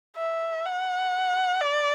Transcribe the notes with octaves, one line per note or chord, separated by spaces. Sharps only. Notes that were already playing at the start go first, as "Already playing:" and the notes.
E5
F#5
D5